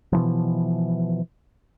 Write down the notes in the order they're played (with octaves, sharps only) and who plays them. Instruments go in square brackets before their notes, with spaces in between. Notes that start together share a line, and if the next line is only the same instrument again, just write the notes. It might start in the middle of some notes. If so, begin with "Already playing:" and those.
[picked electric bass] B2 E3 F3